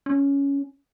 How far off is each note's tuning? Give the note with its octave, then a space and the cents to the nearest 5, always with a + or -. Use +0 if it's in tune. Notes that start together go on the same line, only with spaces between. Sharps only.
C#4 +10